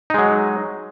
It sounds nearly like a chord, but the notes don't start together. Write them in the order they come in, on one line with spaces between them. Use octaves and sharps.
D#4 G#3 F#3